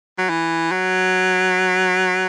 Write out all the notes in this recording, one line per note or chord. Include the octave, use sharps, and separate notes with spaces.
F#3
E3
F#3